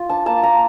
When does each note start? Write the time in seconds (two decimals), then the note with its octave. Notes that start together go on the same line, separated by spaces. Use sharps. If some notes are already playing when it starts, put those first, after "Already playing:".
Already playing: F4
0.09 D4 A5
0.26 A#3 A5
0.43 A#3 A#5